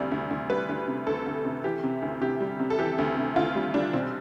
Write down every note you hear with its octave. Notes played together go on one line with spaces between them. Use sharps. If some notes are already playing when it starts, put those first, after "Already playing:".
Already playing: D2 C3 G3 D5
D2
D2
G3 B4
D2
C3
D2 A4
D2
C3
E3 G4
C3
D2
C3 G4
G3
C3
A4
E3 G4
D2
C3
D2 F4
G3
G3 D4
B1 C4